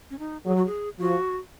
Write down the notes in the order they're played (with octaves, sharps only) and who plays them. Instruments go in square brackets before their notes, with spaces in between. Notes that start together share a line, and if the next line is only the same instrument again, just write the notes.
[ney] C#4
D#4
[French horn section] F#3 [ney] G#4
[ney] F#4
G#4
[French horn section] F3 [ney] F#4